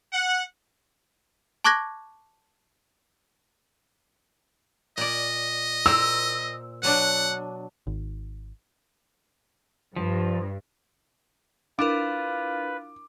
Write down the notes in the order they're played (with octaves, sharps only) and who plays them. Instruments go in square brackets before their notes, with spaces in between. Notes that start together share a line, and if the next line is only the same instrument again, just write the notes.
[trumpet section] F#5
[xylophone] A5 C#6 D6 F#6 G#6 A#6
[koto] A#2 D5 [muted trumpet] D#5
[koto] A#2 A#4 C5 [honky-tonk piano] E6
[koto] B2 F#3 D4 [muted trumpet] F#5
[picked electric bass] G#1
[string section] G2 [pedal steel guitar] F3
[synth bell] D4 E4 A#4 [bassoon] F4 [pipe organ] B4 [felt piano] D6